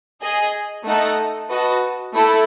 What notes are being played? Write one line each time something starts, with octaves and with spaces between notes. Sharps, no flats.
G#4 D#5 G#5
A3 D#4 A4 D#5 F#5
F#4 B4 D#5 A5
A3 E4 A4